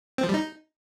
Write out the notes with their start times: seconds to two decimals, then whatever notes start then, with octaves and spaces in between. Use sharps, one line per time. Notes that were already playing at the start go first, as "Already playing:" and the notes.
0.18 C4
0.24 F3
0.29 G3
0.34 D#4